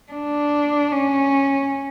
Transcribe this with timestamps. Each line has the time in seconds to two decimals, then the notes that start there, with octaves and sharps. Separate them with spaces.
0.13 D4
0.93 C#4